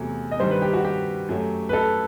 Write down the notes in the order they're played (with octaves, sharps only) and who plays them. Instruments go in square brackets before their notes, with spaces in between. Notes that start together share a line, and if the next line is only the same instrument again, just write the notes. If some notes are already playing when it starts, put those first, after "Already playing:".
Already playing: [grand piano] E2 C3 F#3 A3
D#5
G2 D#3 G3 C5
B4
G4
F#4
G4
F#2 F#3 A3
B4
A4